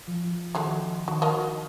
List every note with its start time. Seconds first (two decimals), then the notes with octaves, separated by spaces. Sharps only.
0.07 F3
0.55 D#3 F#3 G#3 A3
1.08 D#3 F#4
1.22 F#4 A#4 D#5